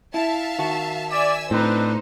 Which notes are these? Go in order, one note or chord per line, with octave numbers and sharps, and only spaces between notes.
E4 E5 F5 A5
D#3 F#4
D5 E5 G#5 E6
A2 C4 D4 D#4 B4 C5